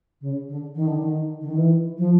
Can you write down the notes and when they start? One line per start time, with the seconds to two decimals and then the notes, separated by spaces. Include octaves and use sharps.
0.21 C#3
0.48 D3
0.75 D#3
0.87 D3
1.00 D#3
1.41 D3
1.49 D#3
1.57 E3
1.98 F3